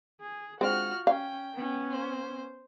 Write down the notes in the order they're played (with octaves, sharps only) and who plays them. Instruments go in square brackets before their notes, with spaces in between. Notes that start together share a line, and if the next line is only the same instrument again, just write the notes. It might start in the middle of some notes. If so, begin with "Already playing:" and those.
[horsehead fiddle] G#4
[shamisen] G#3 C4 D4 [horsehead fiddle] F4 F#5 [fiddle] F#4 F6
[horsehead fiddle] C#4 [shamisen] F5 [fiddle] G5
[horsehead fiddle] B3 C#4
[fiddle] C5